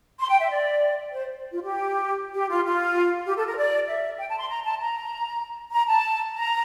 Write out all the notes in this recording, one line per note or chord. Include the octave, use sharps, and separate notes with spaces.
C6
G5
E5
D5
C5
F4
G4
G4
F4
F4
G4
A4
A#4
D5
E5
G5
A5
C6
A#5
A5
A#5
A#5
A5
A#5